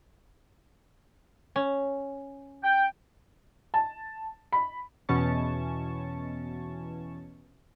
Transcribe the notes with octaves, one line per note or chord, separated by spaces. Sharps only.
C#4
G5
A5
B5
E2 B2 E3 C#4 A5 C#6